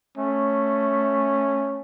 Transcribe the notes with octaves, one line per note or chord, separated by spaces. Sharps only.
A3 C#4